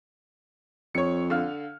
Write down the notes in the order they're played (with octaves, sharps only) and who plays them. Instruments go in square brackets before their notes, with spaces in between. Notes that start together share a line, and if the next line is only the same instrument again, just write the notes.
[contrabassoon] F2 [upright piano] C#5 C#7
[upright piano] D3 F5 F6